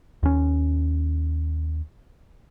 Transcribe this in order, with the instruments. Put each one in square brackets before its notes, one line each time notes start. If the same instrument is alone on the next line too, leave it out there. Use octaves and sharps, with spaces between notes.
[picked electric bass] D#2 C#4